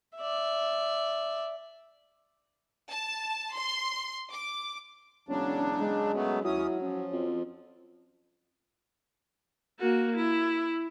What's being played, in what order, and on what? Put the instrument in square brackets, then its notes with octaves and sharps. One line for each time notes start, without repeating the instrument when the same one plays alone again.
[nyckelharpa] D5 E5
[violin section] A5
C6
D6
[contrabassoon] E1 [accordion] C#3 F#3 D4 [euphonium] C#4
[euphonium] G#3
[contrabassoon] F#2 [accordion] F#3 A3 B3
[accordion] D#2 C#4 D#6 [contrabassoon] F#3 [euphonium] E4
[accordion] F3 [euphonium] C#4
[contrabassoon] F2
[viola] A#3 F#4
E4